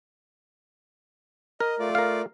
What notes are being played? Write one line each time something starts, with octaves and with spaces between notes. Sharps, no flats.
A#4 D#5
A3 F4 D5
A#4 F5